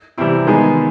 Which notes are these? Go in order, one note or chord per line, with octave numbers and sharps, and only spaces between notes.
C3 E3 G3 C4 E4
D#3 G#3 B3 D#4 G#4